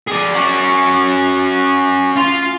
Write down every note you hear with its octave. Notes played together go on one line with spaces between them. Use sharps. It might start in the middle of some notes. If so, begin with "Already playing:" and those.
G#4 D5
C#4 F#4
F4